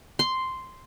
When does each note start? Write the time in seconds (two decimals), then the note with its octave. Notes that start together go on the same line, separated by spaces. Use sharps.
0.19 C6